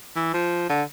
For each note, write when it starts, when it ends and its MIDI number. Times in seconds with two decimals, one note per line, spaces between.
0.16 0.31 52
0.34 0.64 53
0.70 0.83 50